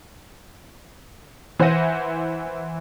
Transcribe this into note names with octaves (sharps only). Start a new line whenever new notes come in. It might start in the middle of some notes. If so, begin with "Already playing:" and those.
E3 C5 E5 F#5 A#6 D#7